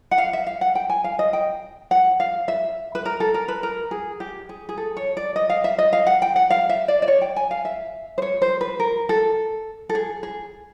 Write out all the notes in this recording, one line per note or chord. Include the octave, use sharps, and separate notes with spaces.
F#5
F5
E5
F5
F#5
G5
G#5
F5
D#5
G5
F#5
F5
E5
B4
A#4
A4
A#4
B4
A#4
G#4
G4
G#4
G#4
A4
C#5
D5
D#5
F5
E5
D#5
F5
F#5
G5
F#5
F5
E5
D5
D5
C#5
G5
G#5
F5
E5
C5
C#5
C5
B4
A#4
A4
A4
G#4
G#4